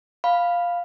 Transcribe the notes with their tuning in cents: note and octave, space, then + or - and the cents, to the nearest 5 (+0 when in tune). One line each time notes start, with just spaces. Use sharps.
F5 +0 B5 +0